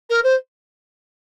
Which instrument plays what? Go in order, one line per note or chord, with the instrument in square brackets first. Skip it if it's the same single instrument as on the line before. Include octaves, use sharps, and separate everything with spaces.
[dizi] A#4
C5